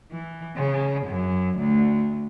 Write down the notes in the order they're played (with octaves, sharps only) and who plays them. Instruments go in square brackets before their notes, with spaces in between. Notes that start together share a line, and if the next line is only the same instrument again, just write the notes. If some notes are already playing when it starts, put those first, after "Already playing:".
[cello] E3
C#3
F#2
D2